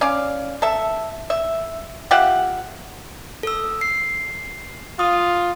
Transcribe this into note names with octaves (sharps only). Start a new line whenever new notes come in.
C#4 D5 F5
A4 E5
E5
F4 G4 E5 F#5
A4 E6
C7
F4 D#6